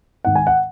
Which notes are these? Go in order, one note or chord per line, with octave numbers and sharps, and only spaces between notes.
G#2 D#3 F#5
G#5
F#5